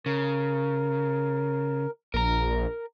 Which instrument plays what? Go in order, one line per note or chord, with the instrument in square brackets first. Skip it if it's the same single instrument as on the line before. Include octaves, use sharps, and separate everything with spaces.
[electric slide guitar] C#3 [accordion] A#4
[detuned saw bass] A#1 [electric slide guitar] A#4 A#5